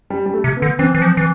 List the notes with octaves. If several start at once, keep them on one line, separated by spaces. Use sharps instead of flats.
G3
G3
A3
C3
B3
D3
E3 C4
E3
F3
E3